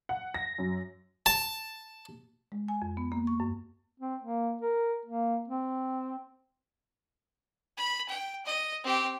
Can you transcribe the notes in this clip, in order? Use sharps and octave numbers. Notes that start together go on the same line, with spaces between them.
F#5
A#6
F#2
A5
G#3
G#5
F2
B3
A#3
C#6
F#2
C4
A#3
A#4
A#3
C4
B5
G5
D#5
C4 G4